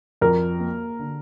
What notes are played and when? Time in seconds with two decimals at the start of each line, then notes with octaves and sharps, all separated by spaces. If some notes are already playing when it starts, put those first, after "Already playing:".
0.21 F2 A#4
0.60 A#3
0.99 D3